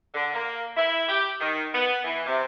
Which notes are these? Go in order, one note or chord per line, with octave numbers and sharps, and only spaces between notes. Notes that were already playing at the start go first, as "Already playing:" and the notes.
D3
A#3
E4
G4
D#3
B3
E3
C3